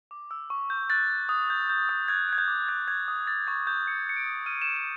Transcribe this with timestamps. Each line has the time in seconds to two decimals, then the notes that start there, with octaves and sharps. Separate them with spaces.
0.11 D6
0.31 E6
0.50 C#6
0.70 G6
0.90 F#6 A6
1.10 F#6
1.29 D#6
1.50 G6
1.69 G6
1.89 D#6
2.08 F#6 G#6
2.28 F#6 G#6
2.38 G6
2.48 D6
2.68 F#6 G#6
2.87 F#6 G#6
3.08 D#6
3.27 E6 A6
3.47 C#6 G#6
3.67 G6
3.87 F#6 C#7
4.06 F#6 C#7
4.17 D7
4.26 D#6
4.46 F6 D#7
4.62 E7
4.67 F6
4.77 E7